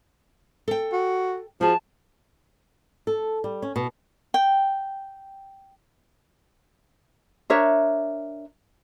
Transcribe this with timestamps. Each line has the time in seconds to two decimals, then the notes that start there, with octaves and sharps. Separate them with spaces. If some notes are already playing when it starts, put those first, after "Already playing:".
0.68 A4 G5
0.93 F#4
1.61 F3 F#4 G#4 A5
3.07 A4
3.44 G3
3.62 C#4
3.76 B2
4.34 G5
7.50 D4 A#4 C#5 E5